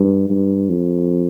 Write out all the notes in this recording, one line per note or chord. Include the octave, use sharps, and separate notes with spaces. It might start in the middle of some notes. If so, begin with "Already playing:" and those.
Already playing: G2
G2
F2